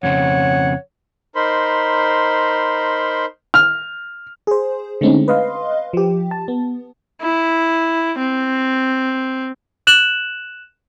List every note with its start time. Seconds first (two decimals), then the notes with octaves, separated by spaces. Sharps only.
0.03 F2 C#3 C4 C#5 F#5
1.35 D#4 A#4 C5 B5 C6
3.54 F6
4.47 G#4 C5
5.01 D3 G#3 A3 C4 C#4 D#4
5.28 B4 D#5 F5 C6
5.93 F3 G4
6.31 A5
6.48 B3
7.22 E4
8.19 C4
9.87 F#6 E7 F#7